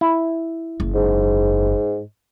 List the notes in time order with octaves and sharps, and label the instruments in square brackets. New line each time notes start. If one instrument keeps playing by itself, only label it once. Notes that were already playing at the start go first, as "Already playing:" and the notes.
[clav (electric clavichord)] E4
[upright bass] F#1
[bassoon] G#2